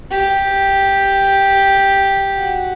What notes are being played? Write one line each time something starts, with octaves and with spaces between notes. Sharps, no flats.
G4
F#4